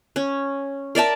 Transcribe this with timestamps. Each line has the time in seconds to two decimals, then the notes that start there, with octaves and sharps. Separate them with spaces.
0.16 C#4
0.95 A#4 D5 E5 A5